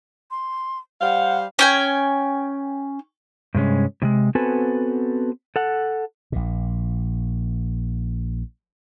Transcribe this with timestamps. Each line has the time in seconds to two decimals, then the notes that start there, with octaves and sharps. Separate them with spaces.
0.31 C6
1.01 G3 C5 F5 F#5
1.59 C#4 G5 G#5
3.54 G2 C3 G#3 C#4
4.02 A2 C3 G#3
4.35 B3 C4 F#4 A4 B4 G#5
5.56 A4 F#5
6.32 A#1 A#2